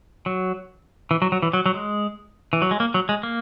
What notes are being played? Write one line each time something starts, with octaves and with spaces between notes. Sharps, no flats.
F#3
E3
F#3
F#3
E3
F#3
F#3
G#3
E3
F#3
G#3
A#3
F#3
G#3
A#3